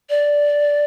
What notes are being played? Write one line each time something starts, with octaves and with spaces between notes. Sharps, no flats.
D5